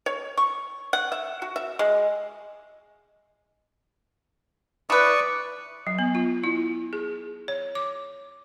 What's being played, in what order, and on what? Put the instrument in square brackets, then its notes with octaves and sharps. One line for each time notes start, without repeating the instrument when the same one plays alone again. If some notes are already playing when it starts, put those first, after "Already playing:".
[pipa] C#5
C#6
F#5
E5
F#4
E5
G#3
[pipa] E4 B4 [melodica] D5 C#6 D#6
[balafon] F#3
B3
F4
E4
G#4
C#5
D6